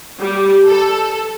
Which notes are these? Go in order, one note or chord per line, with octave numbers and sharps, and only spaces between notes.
G3
A4